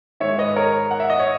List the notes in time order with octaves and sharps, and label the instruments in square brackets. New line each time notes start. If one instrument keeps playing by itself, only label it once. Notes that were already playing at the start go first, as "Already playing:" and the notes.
[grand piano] G#2 D#3 C#5 E5
B4 D#5
A#4 C#5
F#5
E5
D#5
C#5